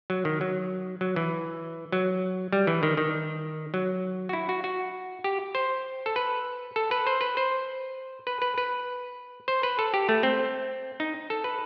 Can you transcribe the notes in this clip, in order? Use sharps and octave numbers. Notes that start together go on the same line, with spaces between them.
F#3
D#3
F#3
F#3
E3
F#3
G3
E3
D#3
D#3
F#3
F#4
E4
F#4
F#4
G4
C5
A4
B4
A4
B4
C5
B4
C5
B4
B4
B4
C5
B4
A4
G4
A3
C4
D#4
A4
B4